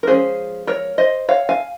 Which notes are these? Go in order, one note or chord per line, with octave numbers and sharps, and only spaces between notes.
A#4
F3 G#3 C#4 G#4 C5
A#4 C#5
C5 D#5
C#5 F5
F5 G#5